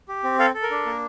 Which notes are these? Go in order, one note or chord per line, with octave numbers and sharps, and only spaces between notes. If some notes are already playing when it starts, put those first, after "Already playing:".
G4
C4
A4 F5
A4
A#4
D4
A#3